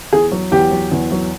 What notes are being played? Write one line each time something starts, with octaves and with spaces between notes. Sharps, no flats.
E2 G#4
F#3
E2 G4
F#3
E2
F#3